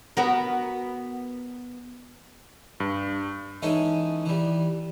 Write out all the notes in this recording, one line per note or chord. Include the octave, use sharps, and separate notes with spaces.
B3 F#4 A#4
G2
E3 G#3 C#4 D#4 A4
E3 G3